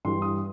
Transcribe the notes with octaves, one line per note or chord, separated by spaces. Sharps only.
G2 E3 G3 C6
D#6